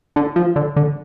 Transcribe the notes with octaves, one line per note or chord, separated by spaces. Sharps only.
D3
F3
D3
D3